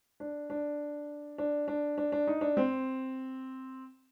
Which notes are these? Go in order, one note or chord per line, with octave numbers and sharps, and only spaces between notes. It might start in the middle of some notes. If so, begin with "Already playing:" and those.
D4
D4
D4
D4
D4
D4
D#4
D4
C4